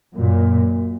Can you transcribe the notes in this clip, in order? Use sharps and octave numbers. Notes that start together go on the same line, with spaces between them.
F#2 A#2